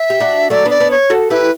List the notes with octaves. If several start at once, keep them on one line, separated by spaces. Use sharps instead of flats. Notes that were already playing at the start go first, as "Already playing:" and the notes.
Already playing: E5
G4
D4 F#4
F#3 A3 D5
B3 D4 D5
B3 D4
C#5
F#4 A4
E4 G4 B4